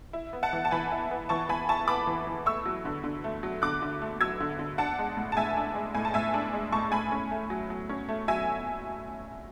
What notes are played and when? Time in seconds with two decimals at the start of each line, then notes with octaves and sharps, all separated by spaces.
0.13 E4
0.33 B3
0.43 F#5 A5
0.53 E3
0.65 A5
0.71 E3 G#5 B5
0.92 E4
1.11 B3
1.29 E3 A5 C#6
1.49 E3 G#5 B5
1.69 E4 A5 C#6
1.88 B3 B5 D6
2.07 E3
2.27 E3
2.46 A3 C#6 E6
2.66 F#3
2.85 D3
3.04 D3
3.24 A3
3.43 F#3
3.62 D3 D6 F#6
3.82 D3
4.02 A3
4.21 F#3 E6 G#6
4.40 D3
4.59 D3
4.78 D4 F#5 A5
4.99 G#3
5.17 A2
5.32 A5
5.37 A2 E5 G#5
5.57 D4
5.75 G#3
5.95 A2 G#5
6.05 A5
6.14 A2 E5 G#5
6.34 D4
6.53 G#3
6.72 A2 A5 C#6
6.92 A2 G#5 B5
7.12 C#4
7.31 A3
7.50 F#3
7.70 F#3
7.89 C#4
8.09 A3
8.28 F#3 E5 G#5